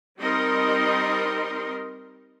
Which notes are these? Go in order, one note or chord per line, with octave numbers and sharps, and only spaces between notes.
G3 C4 D#4 A#4 D#5 C6